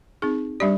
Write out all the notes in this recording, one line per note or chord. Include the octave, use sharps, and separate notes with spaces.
C4 D#4 G#4
G3 D4 G4 D5